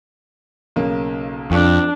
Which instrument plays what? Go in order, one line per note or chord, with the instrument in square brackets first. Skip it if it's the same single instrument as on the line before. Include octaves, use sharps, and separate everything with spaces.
[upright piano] B1 C#3 A#3
[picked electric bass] F2 [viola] D4